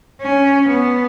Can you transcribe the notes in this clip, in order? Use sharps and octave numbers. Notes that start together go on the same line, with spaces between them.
C#4
B3